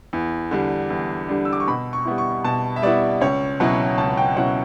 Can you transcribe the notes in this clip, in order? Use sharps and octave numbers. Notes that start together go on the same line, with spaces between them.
E2
D3 G3 D4
E2
D3 G3 D4
E6
D6
C#6
B2 B5
C#6
G3 B3 E4
C#6
B2 A5
E5
G3 B3 E4 D5
C#2 C#5
B2 F#3 C#4 E4 F#5
C#2 A5
G5
B2 F#3 C#4 E4 F#5